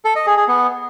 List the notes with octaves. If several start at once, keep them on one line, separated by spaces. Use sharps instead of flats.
A4
D#5
G#4
G#4
B3